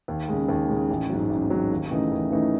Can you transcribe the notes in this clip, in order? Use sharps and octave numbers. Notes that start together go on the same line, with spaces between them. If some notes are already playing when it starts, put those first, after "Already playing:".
D#2
C#3 G#3
D#2
C#3 G#3
A1
G#2 F#3
A1
G#2 F#3
D#2
C#3 E3 A3 D#4
D#2
C#3 E3 A3 D#4